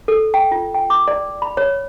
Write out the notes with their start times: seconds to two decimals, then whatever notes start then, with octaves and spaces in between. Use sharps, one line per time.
0.08 A4
0.34 G5
0.51 F4
0.75 G5
0.90 D6
1.08 D5
1.42 B5
1.57 C#5